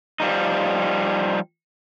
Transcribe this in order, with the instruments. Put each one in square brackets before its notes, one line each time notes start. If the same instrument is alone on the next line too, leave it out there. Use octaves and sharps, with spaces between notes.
[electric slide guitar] F3 G3 D#4